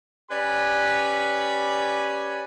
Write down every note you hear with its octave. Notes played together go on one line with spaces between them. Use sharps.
C#4 G4 B4 D5 B5